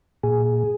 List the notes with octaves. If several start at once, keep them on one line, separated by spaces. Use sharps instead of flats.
A#2 G#4